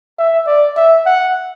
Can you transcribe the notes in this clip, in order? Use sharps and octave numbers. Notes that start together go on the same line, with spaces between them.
E5
D5
E5
F#5